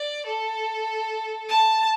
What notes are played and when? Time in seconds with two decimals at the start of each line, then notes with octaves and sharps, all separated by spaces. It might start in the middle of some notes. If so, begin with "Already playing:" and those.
Already playing: D5
0.26 A4
1.49 A5